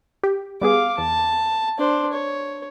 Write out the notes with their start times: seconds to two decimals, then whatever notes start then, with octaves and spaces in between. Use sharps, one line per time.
0.23 G4
0.61 G3 B3 G#4 F5 D6
0.98 E2 A5
1.78 D4 C5
2.12 C#5